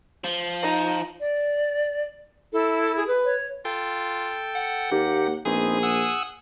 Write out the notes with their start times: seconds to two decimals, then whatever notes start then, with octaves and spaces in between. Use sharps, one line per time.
0.24 F3
0.62 D#4
1.20 D5
2.53 E4 A4
2.96 G#4
3.08 B4
3.25 C#5
3.65 F4 A4 G5
4.55 F#5
4.92 D#2 A#3 G4
5.46 A#1 B3 C4 D#4 G#4
5.83 F#5 D#6 E6